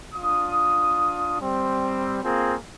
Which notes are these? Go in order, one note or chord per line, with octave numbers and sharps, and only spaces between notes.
D4 F4 D#6
G3 C4
A#3 C4 F4 G#4